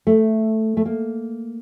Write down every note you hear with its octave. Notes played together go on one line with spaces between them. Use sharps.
A3
A3
A#3